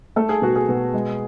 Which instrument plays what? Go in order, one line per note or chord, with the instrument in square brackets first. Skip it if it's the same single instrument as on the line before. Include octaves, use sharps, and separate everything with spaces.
[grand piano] A3 A4
G#4
B2 F#4
G#4
B2
G#3